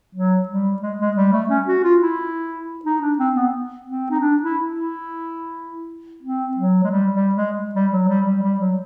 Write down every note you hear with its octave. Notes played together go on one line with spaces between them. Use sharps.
F#3
G3
G#3
G#3
G3
A3
C#4
F#4
F4
E4
D#4
D4
C4
B3
C4
D#4
D4
E4
E4
C4
F#3
G#3
G3
G3
G#3
G3
F#3
G3
G3
G3
F#3